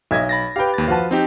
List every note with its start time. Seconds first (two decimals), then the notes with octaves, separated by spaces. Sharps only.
0.11 B1 D#5 E5 G#6
0.29 B5 A6 A#6
0.56 G4 B4 F5 G5
0.74 D#2 A6
0.88 F3 F4 F#4 B4 A5
1.11 C4 D#4 G4